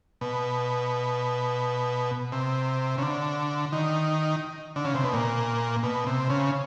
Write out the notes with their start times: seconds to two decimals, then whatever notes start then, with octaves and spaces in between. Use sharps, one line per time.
0.21 B2
2.32 C3
2.98 C#3
3.02 D3
3.72 D#3
4.76 D3
4.85 C#3
4.95 C3
5.04 B2
5.13 A#2
5.83 B2
6.07 C3
6.30 C#3